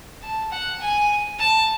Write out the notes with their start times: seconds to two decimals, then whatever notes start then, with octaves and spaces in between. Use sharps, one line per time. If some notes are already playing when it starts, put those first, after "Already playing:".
0.22 A5
0.51 F#5
0.81 G#5
1.38 A5